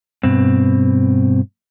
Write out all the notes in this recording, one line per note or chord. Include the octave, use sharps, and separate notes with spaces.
G2 B2 C4